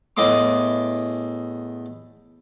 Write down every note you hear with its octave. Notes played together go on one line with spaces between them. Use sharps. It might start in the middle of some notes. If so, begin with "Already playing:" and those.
E2 A2 D#5 C6 D6